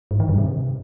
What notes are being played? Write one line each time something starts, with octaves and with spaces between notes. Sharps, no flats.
G#2
D#3
G2
C3